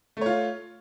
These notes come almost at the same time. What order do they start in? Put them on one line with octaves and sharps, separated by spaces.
A3 C#5 F4